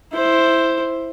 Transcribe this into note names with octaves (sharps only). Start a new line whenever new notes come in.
E4 C5